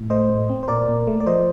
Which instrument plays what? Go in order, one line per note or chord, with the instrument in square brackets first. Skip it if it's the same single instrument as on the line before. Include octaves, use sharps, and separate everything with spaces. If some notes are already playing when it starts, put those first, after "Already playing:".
Already playing: [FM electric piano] A2
A3 C5 D#5
A2
C4
C5
A#2 A#4 D5
A#2
A3
D5
F3 C5 D#5